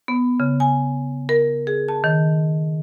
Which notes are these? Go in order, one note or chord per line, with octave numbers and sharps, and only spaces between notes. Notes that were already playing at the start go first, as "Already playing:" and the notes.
B3
C#3
G#5
A#4
G#4
A5
D#3